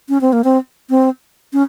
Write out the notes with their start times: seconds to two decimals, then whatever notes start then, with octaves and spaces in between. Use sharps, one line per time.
0.09 C#4
0.21 C4
0.33 A#3
0.44 C4
0.90 C4
1.53 C#4